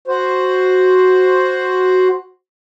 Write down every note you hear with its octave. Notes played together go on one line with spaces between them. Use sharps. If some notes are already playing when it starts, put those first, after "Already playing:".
F#4 C5